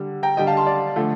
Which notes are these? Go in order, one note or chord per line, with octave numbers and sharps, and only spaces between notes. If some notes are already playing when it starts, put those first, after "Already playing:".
Already playing: D3 G3
G5 A#5
D3 G3 D#5 G5
F5 A5
A5 C6
D5
D3 F3 A3